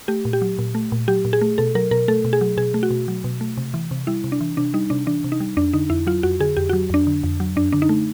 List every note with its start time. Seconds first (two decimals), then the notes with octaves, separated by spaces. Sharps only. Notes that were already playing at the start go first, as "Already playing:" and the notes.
0.08 A3 G4
0.25 A#2
0.33 G4
0.42 F#3
0.59 A#2
0.75 A3
0.92 A#2
1.08 F#3 G4
1.25 A#2
1.33 G#4
1.41 A3
1.58 B2 A4
1.75 F#3 A#4
1.91 B2 A#4
2.08 A3 A4
2.25 B2
2.33 G#4
2.41 F#3
2.57 B2 G#4
2.74 A3
2.83 F#4
2.90 B2
3.08 F#3
3.24 B2
3.41 A3
3.57 C3
3.74 E3
3.91 C3
4.07 G3 E4
4.24 C3
4.32 D4
4.41 E3
4.57 C3 D4
4.74 G3 D#4
4.90 C3 D4
5.07 E3 D4
5.24 C3
5.32 D#4
5.40 G3
5.57 F2 D4
5.73 D3 D#4
5.90 F2 E4
6.07 F#3 F4
6.23 F2 F#4
6.40 D3 G#4
6.57 F2 G4
6.69 F#3 F#4
6.90 F2 D4
7.07 D3
7.23 F2
7.40 F#3
7.56 F#2 D4
7.72 D3 D4
7.82 D#4
7.89 A3